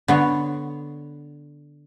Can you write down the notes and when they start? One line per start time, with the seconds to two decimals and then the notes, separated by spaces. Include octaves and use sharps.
0.08 D3 B3 C#5